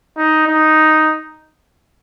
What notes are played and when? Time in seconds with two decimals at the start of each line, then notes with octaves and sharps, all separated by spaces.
0.17 D#4
0.47 D#4